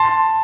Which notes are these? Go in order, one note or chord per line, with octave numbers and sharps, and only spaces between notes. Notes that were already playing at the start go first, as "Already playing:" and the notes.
Already playing: A5 C6